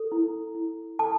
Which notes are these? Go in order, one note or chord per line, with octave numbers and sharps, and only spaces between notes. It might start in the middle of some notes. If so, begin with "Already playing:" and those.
Already playing: A4
E4
E4
A4 A5